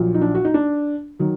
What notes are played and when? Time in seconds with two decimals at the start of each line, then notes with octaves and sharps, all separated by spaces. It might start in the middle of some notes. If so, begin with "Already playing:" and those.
Already playing: A#1 A#2 F#3
0.14 D#4
0.21 D4
0.35 F#4
0.45 D#4
0.54 D4
1.19 D#3 F#3